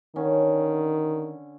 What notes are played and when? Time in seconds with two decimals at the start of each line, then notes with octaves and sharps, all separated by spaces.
0.16 D3 D#3 C#4